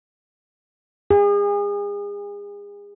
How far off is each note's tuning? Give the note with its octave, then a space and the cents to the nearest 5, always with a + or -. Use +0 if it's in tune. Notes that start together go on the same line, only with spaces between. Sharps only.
G#4 -35